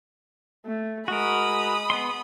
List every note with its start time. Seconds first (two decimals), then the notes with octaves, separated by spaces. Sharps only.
0.66 A3
1.08 G#3 F#4 A#4 B5 D#6
1.90 B3 D#5 C6